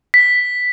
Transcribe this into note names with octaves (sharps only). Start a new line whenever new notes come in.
B6